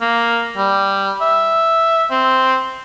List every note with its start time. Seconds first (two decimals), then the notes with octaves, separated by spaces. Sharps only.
0.01 A#3
0.57 G3
1.21 E5
2.11 C4